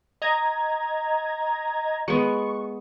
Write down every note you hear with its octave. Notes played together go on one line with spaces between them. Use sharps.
D#5 A#5 G#6
G#3 B3 C#6